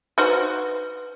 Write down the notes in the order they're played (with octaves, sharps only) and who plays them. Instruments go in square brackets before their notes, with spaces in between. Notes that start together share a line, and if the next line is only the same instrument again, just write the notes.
[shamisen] D#4 F#4 C5 [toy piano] B4